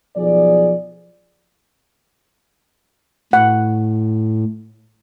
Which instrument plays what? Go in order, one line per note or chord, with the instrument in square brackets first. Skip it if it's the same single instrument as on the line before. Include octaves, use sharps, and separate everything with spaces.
[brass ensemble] B1 F3 G#4 D5
[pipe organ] A2 [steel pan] F#5